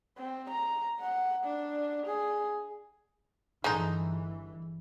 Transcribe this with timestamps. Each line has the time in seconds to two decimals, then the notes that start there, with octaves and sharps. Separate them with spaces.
0.18 C4
0.50 A#5
1.00 F#5
1.45 D4
2.06 G#4
3.64 G1 E3 G#3 A3 D#4